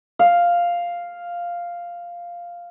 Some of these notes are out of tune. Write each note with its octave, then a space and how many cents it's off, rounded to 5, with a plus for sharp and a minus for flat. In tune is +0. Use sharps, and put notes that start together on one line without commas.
F5 +0